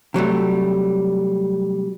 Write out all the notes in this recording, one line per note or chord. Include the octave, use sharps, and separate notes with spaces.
C3 F#3 G3 A3